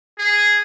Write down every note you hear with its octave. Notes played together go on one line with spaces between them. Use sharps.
G#4